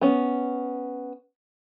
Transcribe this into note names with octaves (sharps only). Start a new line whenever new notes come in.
B3 C#4